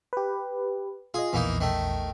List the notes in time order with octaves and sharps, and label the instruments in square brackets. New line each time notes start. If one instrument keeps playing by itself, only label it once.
[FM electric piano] G4 B4
[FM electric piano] F4 D#5 [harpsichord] G#4
[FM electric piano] A#1 E2 [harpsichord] E3 A#3 D#4
[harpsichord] D#3 A3